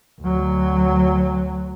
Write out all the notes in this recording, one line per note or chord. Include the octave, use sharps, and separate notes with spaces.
D2 F#3